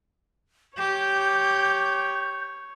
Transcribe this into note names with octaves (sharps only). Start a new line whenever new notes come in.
G4 C#5 G6